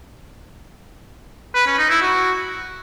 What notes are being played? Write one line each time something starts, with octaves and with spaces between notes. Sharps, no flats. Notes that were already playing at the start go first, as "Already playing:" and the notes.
B4
C#4
D#4
E4
F#4